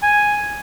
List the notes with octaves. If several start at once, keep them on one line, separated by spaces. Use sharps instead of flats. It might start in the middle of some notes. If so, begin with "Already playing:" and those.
G#5